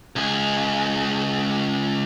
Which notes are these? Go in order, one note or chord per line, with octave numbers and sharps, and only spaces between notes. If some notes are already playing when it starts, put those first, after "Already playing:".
C#2 G#4